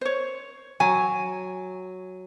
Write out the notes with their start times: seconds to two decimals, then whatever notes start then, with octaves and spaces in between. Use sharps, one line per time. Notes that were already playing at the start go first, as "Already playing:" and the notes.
0.01 C5 C#5
0.80 F#3 G#5